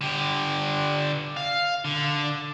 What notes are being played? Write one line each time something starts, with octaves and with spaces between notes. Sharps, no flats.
D3 G4
F5
D3